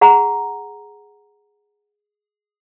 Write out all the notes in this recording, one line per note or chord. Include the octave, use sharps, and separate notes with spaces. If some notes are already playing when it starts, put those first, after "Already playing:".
G#4 F#5 A#5